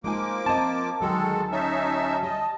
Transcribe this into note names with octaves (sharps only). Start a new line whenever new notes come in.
F3 G#3 A#3 D#4 G#5 D6
C4 D#5 A5
D2 D#3 F#3 G#3 F#4 A4
C#4 D#4 E5
G3 D#5